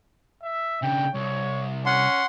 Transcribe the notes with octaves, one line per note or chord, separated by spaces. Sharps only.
E5
C#3 D4 G5
C2 C#5
C#4 F#5 C6